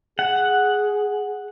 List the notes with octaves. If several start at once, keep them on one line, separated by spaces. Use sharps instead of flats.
G#4 F#5